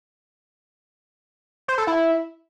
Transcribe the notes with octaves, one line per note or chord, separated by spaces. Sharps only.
C5
A4
E4